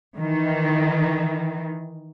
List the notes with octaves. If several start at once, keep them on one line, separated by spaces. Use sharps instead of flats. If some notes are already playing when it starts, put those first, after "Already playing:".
D#3 E3